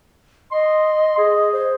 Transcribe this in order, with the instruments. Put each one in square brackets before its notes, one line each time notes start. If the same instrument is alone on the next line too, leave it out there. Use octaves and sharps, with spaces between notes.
[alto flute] D#5 [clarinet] C6
[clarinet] G#4
[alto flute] C5